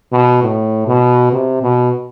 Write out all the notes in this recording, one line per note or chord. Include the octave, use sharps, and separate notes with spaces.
B2
A2
B2
C3
B2